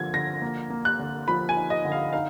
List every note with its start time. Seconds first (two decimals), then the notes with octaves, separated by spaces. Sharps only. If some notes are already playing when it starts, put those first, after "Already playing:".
Already playing: D3 F3 A#3 G#6
0.14 D3 A#6
0.42 A#3
0.70 A#3
0.85 F#6
0.99 D3
1.28 F3 B5
1.49 G#5
1.57 D#4
1.70 D#5
1.85 D3
1.92 F5
2.13 D#4 F5